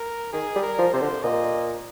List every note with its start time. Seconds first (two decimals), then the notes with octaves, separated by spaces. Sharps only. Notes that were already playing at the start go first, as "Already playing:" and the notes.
Already playing: A#4
0.33 D#3 G#4
0.55 G3
0.62 A#4
0.78 F3
0.93 C3 C5
1.01 D3
1.23 A#2 D#5